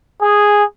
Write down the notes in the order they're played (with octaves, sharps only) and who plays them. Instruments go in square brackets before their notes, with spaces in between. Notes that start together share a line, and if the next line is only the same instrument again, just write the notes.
[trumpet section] G#4